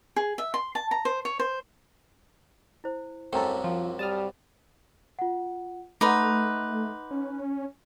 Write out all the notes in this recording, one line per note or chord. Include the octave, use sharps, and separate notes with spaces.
G#4
E5
C6
A5
A#5
C5
C#5
C5
E4 C5
C2 F#2 C3 A3 C#4 A4 G5 A#5
F3
G3 A5 D#6 F6
F4 F#5
A3 D#4 B4 F#5 C6 D6
C#4